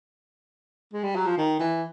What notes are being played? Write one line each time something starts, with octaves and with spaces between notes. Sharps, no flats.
G#3
G3
F#3
F3
D#3
E3